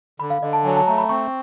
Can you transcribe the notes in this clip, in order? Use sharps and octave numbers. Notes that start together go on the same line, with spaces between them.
D3 B5
F5
D3 D#5
A5
F#3 G#5
A5
A3 A#5
B5
C4 C#6